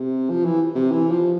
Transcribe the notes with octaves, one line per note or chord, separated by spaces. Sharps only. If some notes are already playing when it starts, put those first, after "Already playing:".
Already playing: C3
F3
E3
C3
E3
F3